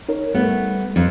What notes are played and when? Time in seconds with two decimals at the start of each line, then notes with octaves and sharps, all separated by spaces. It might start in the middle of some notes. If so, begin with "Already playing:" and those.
0.09 D#4 A#4 C#5
0.34 G3 A3 B3
0.96 F2